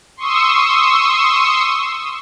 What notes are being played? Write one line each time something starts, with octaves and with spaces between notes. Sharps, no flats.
C6 C#6 D#6 E6